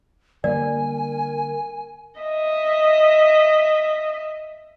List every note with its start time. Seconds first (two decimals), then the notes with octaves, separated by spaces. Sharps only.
0.44 D3 G3 A#3 A#4 D5 G#5
2.21 D#5 E5